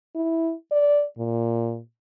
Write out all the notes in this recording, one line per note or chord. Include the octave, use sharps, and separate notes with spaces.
E4
D5
A#2